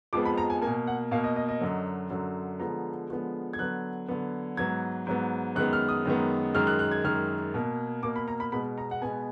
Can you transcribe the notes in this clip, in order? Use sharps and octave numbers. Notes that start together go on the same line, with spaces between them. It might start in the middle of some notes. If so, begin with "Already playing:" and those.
F2 F3 G#3 B3 D6
B5
A#5
G#5
A#3 G#5
B2
F#5
B2 A#3 F5
D#5
D#5
D#5
F#2 D3 F#3
F#2 D3 F#3
D3 F3 G#3 B3 A#5
D3 F3 G#3 B3
G#6
D3 F#3 B3 F#6
D3 F#3 B3
G#2 F#3 B3 G#6
G#2 F#3 B3
F#2 D#3 G#3 B3 F#6
F6
D#6
F#2 D#3 G#3 B3
F#2 D#3 G#3 F6
F#6
F#6
G#6
F#2 D#3 G#3 F6
B2 A#3
B2 A#3 D6
B5
A#5
B5
B2 G#3 B3 B5
A#5
F#5
B2 G#3 B3 G#5